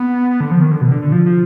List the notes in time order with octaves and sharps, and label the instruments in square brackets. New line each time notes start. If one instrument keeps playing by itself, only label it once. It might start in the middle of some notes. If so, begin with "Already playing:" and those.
Already playing: [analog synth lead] B3
B3
D3
F3
D#3
D3
B2
D3
D3
F3
F3